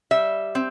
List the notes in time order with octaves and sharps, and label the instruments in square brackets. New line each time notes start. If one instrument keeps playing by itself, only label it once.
[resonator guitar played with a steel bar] G3 E5
C4